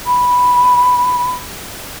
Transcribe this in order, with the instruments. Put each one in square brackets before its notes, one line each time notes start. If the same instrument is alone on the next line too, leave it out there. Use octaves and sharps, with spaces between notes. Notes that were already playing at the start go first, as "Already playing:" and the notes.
[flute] B5